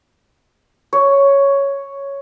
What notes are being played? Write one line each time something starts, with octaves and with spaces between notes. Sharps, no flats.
C#5